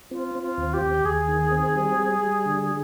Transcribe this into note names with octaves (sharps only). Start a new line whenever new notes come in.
C4 F4
C4
F4
D#2
G4
D#2
D#2 G#4
D#3
C4
G3
G3
G3
D3